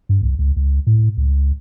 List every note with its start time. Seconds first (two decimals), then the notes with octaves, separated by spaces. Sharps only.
0.09 G2
0.23 C2
0.39 C#2
0.56 C#2
0.87 A2
1.17 C#2